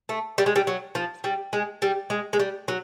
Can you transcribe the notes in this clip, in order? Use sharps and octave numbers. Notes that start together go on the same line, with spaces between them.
A3
G3
G#3
G3
F#3
F3
G3
G#3
G3
G#3
G#3
G3
F#3